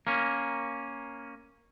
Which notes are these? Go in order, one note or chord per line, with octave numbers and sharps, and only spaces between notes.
A#3 C#4